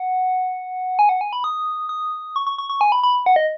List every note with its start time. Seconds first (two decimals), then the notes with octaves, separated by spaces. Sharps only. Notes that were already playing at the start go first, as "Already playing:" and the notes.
Already playing: F#5
0.99 G#5
1.09 F#5
1.21 G#5
1.33 B5
1.44 D#6
1.89 D#6
2.36 C#6
2.47 C#6
2.58 C#6
2.70 C#6
2.81 G#5
2.92 B5
3.03 B5
3.26 F#5
3.36 D#5